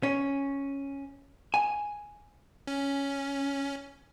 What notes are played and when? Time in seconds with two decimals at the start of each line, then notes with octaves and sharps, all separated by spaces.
0.03 C#4
1.54 G#5
2.67 C#4